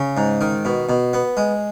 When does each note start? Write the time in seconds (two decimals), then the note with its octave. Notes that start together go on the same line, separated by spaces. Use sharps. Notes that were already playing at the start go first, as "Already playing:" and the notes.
Already playing: C#3 C#4
0.17 G#2
0.41 D#3
0.65 B2
0.89 B2
1.13 B3
1.37 G#3